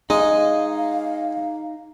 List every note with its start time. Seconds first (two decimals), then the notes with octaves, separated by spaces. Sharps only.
0.10 G#3 D#4 D#5 F5